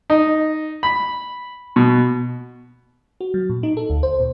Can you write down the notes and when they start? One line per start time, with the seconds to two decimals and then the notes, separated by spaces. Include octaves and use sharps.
0.10 D#4
0.83 B5
1.76 B2
3.21 F#4
3.34 F#3
3.49 A#2
3.63 D#4
3.77 A4
3.90 D2
4.03 C5
4.20 A#2